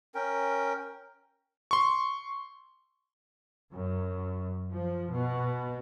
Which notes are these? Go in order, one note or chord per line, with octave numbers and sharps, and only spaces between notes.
C#4 A#4 G5
C6 C#6
F#2
F3
B2